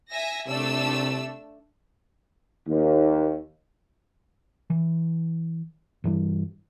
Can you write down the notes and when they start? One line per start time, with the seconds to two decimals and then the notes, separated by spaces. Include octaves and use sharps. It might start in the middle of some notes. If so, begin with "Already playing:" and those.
0.10 E5 G#5 A#6
0.47 C3 A3 D4 E6
2.68 D#2
4.70 E3
6.04 G2 E3 G3